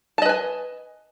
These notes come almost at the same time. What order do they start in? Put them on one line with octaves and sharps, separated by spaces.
A5 D#5 B4 G#5